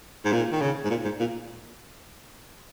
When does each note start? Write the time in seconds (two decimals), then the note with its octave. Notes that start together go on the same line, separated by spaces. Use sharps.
0.25 G#2
0.33 A#2
0.52 D#3
0.61 C#3
0.84 G#2
0.90 A#2
1.04 G#2
1.20 A#2